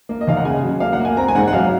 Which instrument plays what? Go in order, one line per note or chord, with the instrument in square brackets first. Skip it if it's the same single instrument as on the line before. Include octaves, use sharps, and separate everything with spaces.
[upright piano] A#3
D#5
D#2 F5
F#5
C#3 G#5
F#3
A#3 F5
F#5
A#3
G#5
C4 A#5
G#5
G#2 F#5
F#5
F#3 F5